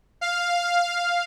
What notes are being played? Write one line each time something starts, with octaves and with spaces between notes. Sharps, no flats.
F5